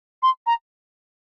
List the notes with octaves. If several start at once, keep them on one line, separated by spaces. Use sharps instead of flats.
C6
A#5